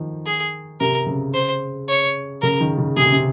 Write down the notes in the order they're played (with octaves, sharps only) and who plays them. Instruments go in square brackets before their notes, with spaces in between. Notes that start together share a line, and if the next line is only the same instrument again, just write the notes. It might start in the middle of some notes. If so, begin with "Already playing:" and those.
Already playing: [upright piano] D#3 F3
[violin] G#4
[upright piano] C3 [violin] A#4
[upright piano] C#3
[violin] C5
C#5
[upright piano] C#3 [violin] A#4
[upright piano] D#3
C#3
[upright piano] C3 [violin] G#4
[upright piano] C#3
C3